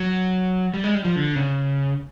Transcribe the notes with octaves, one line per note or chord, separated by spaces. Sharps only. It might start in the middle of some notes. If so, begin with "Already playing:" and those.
Already playing: F#3
G3
G#3
G3
F3
D3
C#3